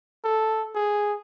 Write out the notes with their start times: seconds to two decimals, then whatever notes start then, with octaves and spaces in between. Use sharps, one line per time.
0.24 A4
0.75 G#4